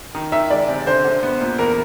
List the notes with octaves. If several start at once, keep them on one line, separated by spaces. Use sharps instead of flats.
D#3
D#3 E5
G#3 D5
C3
D3 C5
D3
B3
A#2
E2 A#4